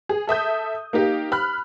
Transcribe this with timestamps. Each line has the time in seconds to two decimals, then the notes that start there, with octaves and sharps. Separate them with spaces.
0.09 G#4
0.27 A4 E5 D#6 G6
0.93 A#3 D#4 G4 F5
1.32 B5 F6 F#6